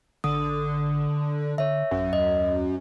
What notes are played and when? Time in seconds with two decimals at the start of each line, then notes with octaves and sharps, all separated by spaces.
0.24 A1 D3 D#6
1.58 D3 C#5 E5
1.91 A1 F#2
2.13 D#2 D#5